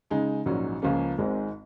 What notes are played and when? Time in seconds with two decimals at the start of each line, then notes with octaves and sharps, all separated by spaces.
0.11 C#3 G#3 D#4
0.46 A#1 G#2 F#3 C#4
0.82 C#2 C#3 F3 A#3 C#4
1.18 G#1 G#2 D#3 G#3 C4